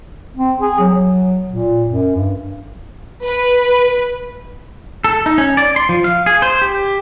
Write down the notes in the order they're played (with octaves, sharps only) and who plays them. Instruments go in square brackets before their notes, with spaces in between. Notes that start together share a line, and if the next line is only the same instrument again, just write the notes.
[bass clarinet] C4
G#4
F#3
F#3
A#2
F#2
G2
[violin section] B4
[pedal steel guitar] A4
D#4
C#4
D5
C6
F3
F5
G#4
C5
G4